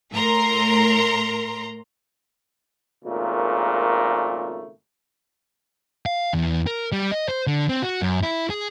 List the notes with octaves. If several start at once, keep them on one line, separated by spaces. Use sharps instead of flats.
A2 A#4 A#5 C6
G#1 A#2 C#3 A3 A#4
F5
E2
A#4
G3
D#5
C5
D3
C4
F#4
F#2
E4
G#4